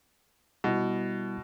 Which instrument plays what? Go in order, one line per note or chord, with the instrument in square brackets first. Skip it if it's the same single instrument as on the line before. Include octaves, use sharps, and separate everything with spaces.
[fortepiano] B2 [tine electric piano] G3 B3 E4